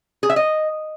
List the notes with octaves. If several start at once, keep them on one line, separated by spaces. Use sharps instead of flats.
G#4
E5
D#5